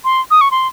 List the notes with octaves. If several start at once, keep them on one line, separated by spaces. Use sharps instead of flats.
C6
D#6
C#6
C6